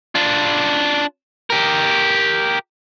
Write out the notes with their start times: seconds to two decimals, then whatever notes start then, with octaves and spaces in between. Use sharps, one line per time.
0.15 D4 F4
1.50 G4 A#4